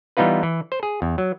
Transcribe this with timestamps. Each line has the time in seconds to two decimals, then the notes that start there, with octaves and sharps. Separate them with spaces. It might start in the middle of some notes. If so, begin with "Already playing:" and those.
0.17 E3 G3 B3 D#4 F4 B4
0.43 E3
0.72 C5
0.83 G#4
1.02 E2
1.18 F#3